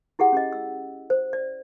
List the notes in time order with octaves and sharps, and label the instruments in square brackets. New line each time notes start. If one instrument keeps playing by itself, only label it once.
[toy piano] E4 G4 G#4 F#5
C#4 G4 D#5
E6
C5
D5